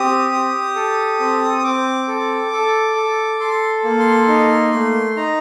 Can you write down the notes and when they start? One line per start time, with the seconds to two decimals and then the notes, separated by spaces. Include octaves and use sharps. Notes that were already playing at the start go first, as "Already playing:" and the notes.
Already playing: C4 G4 D#6
0.32 G4
0.76 A4
1.20 C4
1.58 D#6
1.64 C4 D6
2.08 A4
2.52 A4
2.96 A4
3.40 A4 C6
3.84 A#3
3.99 C6
4.28 D#4
4.73 A3
5.16 D#4 A#5